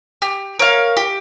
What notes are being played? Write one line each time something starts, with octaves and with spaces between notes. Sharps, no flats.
G4
A#4 C#5 F5
G4